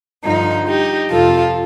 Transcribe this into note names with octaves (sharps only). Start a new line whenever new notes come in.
G2 D3 F3 D#4
D#4 G4
F2 C3 F3 F4 A4